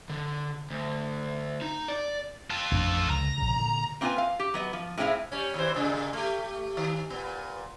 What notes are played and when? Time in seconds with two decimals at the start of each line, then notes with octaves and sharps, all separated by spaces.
0.10 D3
0.70 D2
1.61 D#4
1.88 D5
2.50 F4 A4
2.71 A1 F2 D4
3.10 C#2 D3 A#5
3.38 A#1 C#3
3.56 A#2 D3
4.01 A#3 C4 D4 F4 B4 G#5
4.18 F5
4.39 G4
4.54 F#3 B3 D#5
4.73 F3
4.98 A2 G#3 C4 D4 E4 F5
5.32 G3 C#4
5.54 D#2 E3 C5
5.74 A#2 C#3 G#3
6.13 A3 G4
6.77 D#3
7.10 A#2 B3